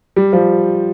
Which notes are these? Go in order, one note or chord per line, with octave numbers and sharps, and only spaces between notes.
G3
F3 G3